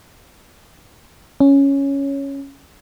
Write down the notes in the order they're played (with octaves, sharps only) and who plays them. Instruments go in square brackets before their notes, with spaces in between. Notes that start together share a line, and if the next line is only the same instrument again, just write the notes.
[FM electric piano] C#4